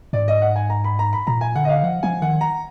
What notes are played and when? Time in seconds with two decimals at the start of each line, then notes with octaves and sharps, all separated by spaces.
0.13 G#2 D5
0.28 D#5
0.42 F#5
0.56 G#5
0.70 A#5
0.84 B5
0.99 A#5
1.13 B5
1.27 A#2 A#5
1.41 G#5
1.56 D3 F#5
1.65 D#5
1.69 F5
1.83 F3 F#5
2.03 F3 G#5
2.22 D#3 F#5
2.41 A#5